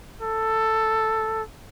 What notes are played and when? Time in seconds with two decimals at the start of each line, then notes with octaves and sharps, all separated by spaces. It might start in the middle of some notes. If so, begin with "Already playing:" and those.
0.22 A4